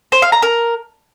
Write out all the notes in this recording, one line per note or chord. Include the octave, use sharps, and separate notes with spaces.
C5
F5
A#5
A#4